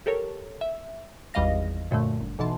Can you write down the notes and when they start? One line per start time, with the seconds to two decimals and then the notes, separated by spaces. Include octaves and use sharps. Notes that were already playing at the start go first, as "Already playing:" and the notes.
0.06 G4 A4 A#4 C#5
0.61 E5
1.34 G#1 E2 G3 D#5 F5 A#6
1.91 F#2 A#2 D3 A3
2.21 G1
2.39 B1 B2 E3 A5 C6